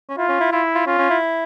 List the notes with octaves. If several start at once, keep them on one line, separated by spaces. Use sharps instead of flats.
C#4
E4 F4
C#4
E4
E4 F4
F4
C#4 F4
C#4
E4